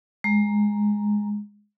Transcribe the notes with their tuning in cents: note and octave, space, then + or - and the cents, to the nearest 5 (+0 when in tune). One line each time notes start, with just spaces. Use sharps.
G#3 +0 A#5 -5